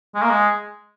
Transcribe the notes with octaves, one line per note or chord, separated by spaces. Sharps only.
G#3
A#3
G#3